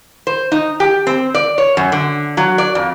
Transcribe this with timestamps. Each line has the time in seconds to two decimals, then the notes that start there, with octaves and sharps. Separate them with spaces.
0.27 C5
0.52 D#4
0.80 G4
1.07 C4
1.34 D5
1.58 C#5
1.77 F#2
1.92 D3
2.37 F#3
2.58 D5
2.75 F2